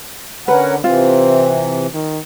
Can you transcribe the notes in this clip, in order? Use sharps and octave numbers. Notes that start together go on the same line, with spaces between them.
D3 C#4 A#4 B4 F#5
C3 E3 C4 F4
D#3